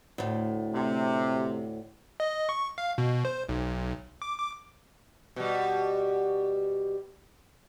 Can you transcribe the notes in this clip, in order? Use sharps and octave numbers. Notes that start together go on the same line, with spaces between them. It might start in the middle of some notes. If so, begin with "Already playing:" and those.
D2 A2
C3
D#5
C#6
F5
B2
C5
B1
D6
D6
B2 G3